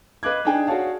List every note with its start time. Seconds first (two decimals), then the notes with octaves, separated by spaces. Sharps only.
0.23 B4 D#5 F5 D6 F#6 G#6
0.45 D4 D#4 G#4 G5 G#5
0.67 F#4 G#4 C#5 D5 F5 A5